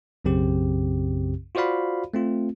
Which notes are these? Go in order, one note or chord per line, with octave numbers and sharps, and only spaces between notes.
B1 F#2 C#3 C4 G4
F4 F#4 C5 D5 F5 B5
A3 C4 F4